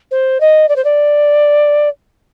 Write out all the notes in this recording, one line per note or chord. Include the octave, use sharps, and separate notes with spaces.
C5
D#5
D5
C5
D5